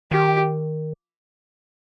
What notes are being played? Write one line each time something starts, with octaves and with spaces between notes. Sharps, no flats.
D#3 G4